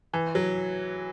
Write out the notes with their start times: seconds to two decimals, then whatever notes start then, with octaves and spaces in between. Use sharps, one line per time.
0.13 E3
0.35 F#3